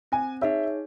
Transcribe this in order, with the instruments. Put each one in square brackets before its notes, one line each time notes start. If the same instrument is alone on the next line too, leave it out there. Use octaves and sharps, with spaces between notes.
[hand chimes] C4 [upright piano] G#5
[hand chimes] D#4 G#4 C#5 [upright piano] E5